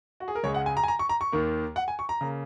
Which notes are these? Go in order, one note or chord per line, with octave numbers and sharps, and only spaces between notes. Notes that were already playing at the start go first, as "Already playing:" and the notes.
F#4
G#4
A#4
C#2 C#3 G#3 C#5
F#5
G#5
A#5
G#5
A#5
C#6
A#5
C#6
D#2 D#3 A#3
F#5
G#5
C#6
A#5
C#3 A#3